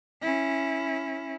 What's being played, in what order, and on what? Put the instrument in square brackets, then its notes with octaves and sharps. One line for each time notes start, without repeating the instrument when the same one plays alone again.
[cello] C#4 E4